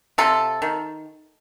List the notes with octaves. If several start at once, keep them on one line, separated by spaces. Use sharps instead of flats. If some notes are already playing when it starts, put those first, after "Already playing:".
C3 F4 A4
D#3